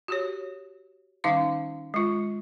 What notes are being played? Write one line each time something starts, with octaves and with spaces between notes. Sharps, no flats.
F#4 G4 C#5
D#3 G3 C#4 D#4 F5 D6
G#3 F4